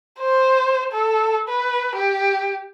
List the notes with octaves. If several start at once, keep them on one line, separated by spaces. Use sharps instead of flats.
C5
A4
B4
G4